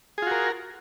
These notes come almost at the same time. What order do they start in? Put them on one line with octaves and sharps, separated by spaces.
G#4 F4 F#4 A#4